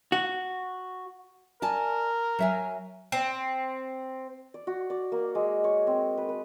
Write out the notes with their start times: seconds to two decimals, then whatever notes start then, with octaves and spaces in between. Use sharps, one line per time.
0.12 F#4
1.62 A#4 D5 G#5 A5
2.39 F#3 E5 G#5
3.12 C4
4.54 D5
4.67 F#4
4.90 D5
5.12 A#3
5.35 G#3
5.64 C#5
5.87 C4
6.17 B4
6.29 B4